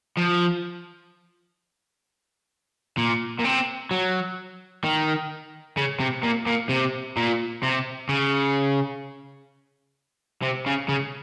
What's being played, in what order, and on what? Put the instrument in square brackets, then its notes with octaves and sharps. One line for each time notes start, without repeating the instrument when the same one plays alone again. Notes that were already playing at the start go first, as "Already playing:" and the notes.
[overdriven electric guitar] F3
A#2
A#2
C3
F#3
D#3
C#3
C3
A#2
A#2
C3
A#2
C3
C#3
C3
C#3
C#3